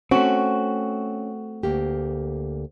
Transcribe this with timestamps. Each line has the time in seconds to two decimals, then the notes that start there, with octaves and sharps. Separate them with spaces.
0.11 A3 C4 C#4 F#4
1.63 D2 A#3 G4